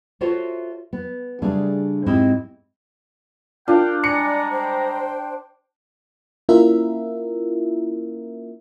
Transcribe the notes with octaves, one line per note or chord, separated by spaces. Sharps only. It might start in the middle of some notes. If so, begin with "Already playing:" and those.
F4 F#4 A4 C5 C#5 E5
B3
C#3 G3 A3 D4 G#4
G#2 C4 E4 G4 D#5 E5
D4 F4 A#4 F5 G5
G3 G#3 D5 G#5 A#5 C#7
C5 G5
A#3 C#4 E4 F4 A#4 E5